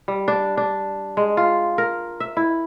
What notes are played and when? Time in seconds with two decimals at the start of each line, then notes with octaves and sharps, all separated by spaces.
0.08 G3
0.28 D4
0.57 D4
1.17 G#3
1.37 F4
1.78 A#4
2.20 E5
2.37 E4